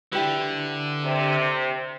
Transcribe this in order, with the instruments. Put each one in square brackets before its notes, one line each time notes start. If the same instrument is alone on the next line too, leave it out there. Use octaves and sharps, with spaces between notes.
[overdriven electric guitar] D3 [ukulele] E4 G4 B4
[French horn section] C3